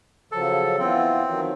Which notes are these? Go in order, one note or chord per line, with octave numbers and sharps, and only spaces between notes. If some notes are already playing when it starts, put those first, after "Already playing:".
C#3 F3 F#3 A4
E3 B3 C4 F4
D#3 F3 F#3